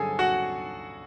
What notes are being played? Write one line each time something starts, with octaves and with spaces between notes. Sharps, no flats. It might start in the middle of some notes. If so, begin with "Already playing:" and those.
Already playing: G2 D3 F#3 G#4 A4 G#5
F#4 F#5